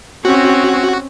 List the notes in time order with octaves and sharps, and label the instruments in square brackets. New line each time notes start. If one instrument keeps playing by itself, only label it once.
[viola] C4 C#4 [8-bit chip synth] F#4